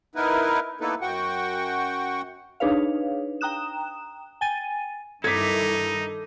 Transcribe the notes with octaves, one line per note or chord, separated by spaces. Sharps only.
B3 D#4 E4 A#4 B4
A#3 B3 D#4 E4 A4 B4
F#2 F#4 F#5 G5 C#6
D4 D#4 G#4 B4 C#5 F5
G5 A#5 D#6 F#6 E7
G5 G#5 A6 D#7
G2 D#3 D#4 E4 A4 D6 G#6 B6